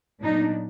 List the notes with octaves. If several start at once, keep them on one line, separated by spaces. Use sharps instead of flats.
A#2 F#3 B3 D4 D#4